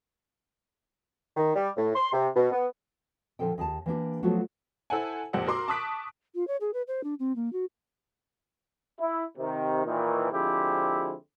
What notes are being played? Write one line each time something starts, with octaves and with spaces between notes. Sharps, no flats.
D#3
G3
A2
C6
C3
B2
B3
A#2 D3 D#3 F3 A4 G5
D#2 G#4 G#5 A5
E3 A#3 D4 G4
F3 F#3 A3 B3 F4 F#4
E4 A4 C5 F#5 G#5
F2 A#2 G4 C5 F#5 E6
F#4 A#4 C6 D6
A5 C#6 D#6 F#6 B6 D7
F4
C#5
G#4
B4
C5
D4
C4
A#3
F#4
E4
C3 D#3
A#2 D#3 E3
D3 F3 G#3 C4 E4 G4